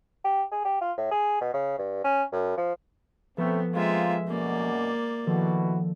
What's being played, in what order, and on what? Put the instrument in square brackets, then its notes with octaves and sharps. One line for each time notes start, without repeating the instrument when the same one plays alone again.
[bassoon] G4
G#4
G4
F4
A2
G#4
B2
C#3
G2
C#4
F#2
F3
[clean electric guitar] F3 A4 B4 [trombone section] A3 C4 [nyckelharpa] B3
[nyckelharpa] G#3 E5 [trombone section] A#3 C4 F4
[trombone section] F#2 B2 [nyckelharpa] A#3 D5
[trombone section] B2 E4 F#4 [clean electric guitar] D#3 F3 A4